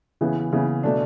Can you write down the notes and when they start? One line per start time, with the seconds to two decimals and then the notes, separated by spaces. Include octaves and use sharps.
0.21 C#3 E3 B3 E4
0.52 C#3 E3 B3 E4
0.83 B2 A3 D4